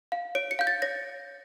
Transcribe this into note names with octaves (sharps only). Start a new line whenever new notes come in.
F5
C#5 D7
C#7
F5 G6
A6
C#5 A#6